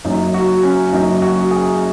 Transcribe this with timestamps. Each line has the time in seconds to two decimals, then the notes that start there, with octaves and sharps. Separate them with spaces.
0.04 F#1 F#2 F#3 D#4
0.34 F#4
0.63 C#4
0.93 F#1 F#2 F#3 D#4
1.22 F#4
1.51 G#4